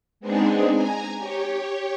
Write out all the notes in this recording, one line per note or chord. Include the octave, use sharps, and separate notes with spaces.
G#3 B3 C4 D4 D#4 G#4
G#5 A#5
G4 C#5